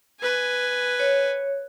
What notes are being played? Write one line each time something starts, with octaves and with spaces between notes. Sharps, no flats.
B4 G#5
C#5